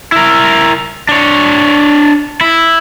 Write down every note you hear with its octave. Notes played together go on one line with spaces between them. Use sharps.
E4 A#4
D4 C#5
E4